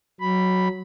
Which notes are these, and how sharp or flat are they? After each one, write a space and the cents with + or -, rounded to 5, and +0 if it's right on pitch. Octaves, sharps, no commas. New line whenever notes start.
F#3 +0 B5 +0